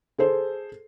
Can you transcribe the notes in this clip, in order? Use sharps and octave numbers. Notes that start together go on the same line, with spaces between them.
G#4 A4 C5